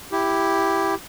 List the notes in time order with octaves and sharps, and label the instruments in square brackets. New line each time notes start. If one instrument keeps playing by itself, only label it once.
[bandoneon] E4 G4